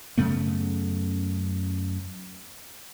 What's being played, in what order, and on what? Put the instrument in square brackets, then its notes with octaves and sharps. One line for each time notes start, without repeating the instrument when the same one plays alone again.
[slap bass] F#2 C#3 A3 B3